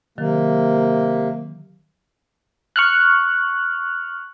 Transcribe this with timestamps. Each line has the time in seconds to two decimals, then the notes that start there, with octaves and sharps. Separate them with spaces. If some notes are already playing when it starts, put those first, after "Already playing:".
0.18 C3 D#3 F#3 A#3
2.76 C#6 F6 F#6